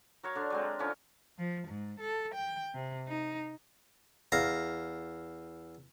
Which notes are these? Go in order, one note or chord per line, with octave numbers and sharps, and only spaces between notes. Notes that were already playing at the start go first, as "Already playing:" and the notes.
F#3 A#4 C#5 F5
D3 D4
F#3 G#3 C4
A#4
D3 F3 C#4 D#4
F3
G#2
A4
G5
C3
D#4
E2 F5 A#5